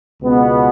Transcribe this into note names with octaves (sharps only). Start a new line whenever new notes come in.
C#2 B2 B3